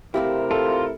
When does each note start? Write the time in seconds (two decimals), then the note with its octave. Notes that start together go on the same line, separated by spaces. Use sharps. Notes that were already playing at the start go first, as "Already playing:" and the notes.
0.14 C3 A3 C4 E4 G4 A#4 F5
0.51 F4 A4